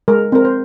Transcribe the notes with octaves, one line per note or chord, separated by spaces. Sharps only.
G#3 A#4
C4 A#4
C5